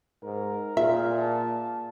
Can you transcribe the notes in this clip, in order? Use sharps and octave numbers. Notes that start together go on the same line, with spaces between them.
G#2 A#4
A#2 F4 G#4 E5 F5
A5